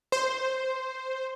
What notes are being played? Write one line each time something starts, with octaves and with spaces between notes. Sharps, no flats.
C5